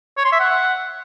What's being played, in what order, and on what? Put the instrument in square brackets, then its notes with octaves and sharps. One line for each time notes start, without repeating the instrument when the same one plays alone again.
[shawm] C#5
C6
E5
F#5